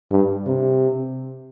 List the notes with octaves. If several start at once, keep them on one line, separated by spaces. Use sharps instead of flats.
G2
C3